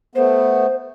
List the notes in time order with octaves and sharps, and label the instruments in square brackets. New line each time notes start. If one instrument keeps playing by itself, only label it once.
[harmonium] A3 B3 [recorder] C5